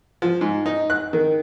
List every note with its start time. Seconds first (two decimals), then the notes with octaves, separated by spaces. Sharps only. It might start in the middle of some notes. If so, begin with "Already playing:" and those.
0.22 F3
0.41 G#2
0.66 D#4
0.90 F#6
1.13 D#3